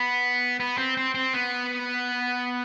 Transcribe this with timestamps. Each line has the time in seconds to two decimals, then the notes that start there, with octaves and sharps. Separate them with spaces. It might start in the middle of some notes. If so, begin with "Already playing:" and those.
Already playing: B3
0.60 B3
0.78 C4
0.97 C4
1.15 C4
1.34 B3